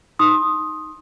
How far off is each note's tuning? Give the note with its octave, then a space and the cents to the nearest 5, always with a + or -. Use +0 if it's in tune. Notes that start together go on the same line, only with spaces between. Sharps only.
D#4 +0 C6 +20 D#6 +0